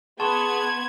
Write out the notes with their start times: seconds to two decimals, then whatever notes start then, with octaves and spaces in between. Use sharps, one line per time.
0.20 B3 G#4 A5 C6 C#6 G#6 E7